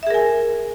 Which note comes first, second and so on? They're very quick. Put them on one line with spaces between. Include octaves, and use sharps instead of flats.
E5 G#4 A#4 G#5